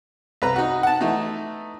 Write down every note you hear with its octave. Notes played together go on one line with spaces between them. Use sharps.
C2 B4 A#5
D#4 F#4
F#5 A5
E3 A3 D#4